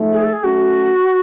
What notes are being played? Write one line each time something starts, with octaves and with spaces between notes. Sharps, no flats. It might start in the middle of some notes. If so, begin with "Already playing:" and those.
Already playing: G#2 F3 A3
G#4
A4
G#4
F#3 A3 C#4 F#4